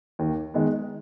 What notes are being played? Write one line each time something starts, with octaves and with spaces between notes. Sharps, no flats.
D#2
D#3 G#3 B3